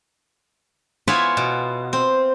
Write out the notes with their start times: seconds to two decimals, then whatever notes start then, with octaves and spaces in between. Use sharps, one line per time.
1.07 B3 E4 F4 C#5 E5 G#5
1.37 B2
1.93 C4